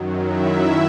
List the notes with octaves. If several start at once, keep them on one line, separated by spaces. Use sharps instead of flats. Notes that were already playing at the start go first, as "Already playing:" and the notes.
Already playing: F#2 D#3 F#3
E4 E5